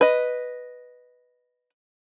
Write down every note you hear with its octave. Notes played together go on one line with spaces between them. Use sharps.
B4 D#5